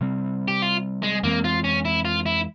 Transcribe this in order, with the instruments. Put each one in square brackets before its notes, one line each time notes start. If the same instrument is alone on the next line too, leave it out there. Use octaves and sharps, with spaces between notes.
[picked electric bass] C3 G3 C4
[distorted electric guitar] G4
F4
G#3
[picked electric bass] F2 E3 G#3 C4 [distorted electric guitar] A#3
[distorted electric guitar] F4
C#4
E4
F4
E4